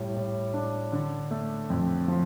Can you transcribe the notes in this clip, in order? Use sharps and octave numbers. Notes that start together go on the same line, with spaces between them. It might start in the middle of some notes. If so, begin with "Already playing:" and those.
Already playing: A2 G3
A2
D4
D3
A3
F2
F3